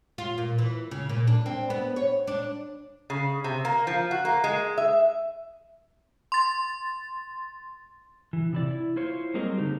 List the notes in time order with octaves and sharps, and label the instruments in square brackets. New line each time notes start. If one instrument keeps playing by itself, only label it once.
[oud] F4
A#2
E3
C#3
A#2
D4
C4
B3
C#5
D4
[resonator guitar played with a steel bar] C#3
C3
A#3
F3
F#4
A#3
G#3
E5
[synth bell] C6 A6
[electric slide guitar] E3
C3 E4 D5
E4
E4 F4 C5 C#5
F#3 G3 A#3 C4 G#4 D#5
D3 C4 D#4 G4